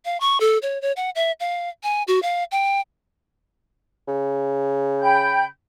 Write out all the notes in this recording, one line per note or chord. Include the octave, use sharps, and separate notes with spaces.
F5
C#6
A4
C#5
C#5
F#5
E5
F5
G#5
F#4
F5
G5
C#3
G5 B5 G6